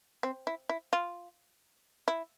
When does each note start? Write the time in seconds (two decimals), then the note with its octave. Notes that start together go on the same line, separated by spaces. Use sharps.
0.23 C4
0.47 E4
0.69 E4
0.93 F4
2.08 E4